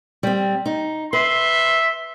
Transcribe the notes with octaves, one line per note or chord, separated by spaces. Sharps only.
G3 C4
D#4
B4 E5 C6